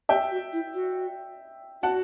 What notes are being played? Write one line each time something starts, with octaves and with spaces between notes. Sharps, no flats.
G4 E5 G5
F#4
E4
F#4
F#4 F#5 A5